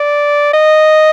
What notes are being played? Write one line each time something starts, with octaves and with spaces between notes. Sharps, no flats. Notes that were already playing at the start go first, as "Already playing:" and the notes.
Already playing: D5
D#5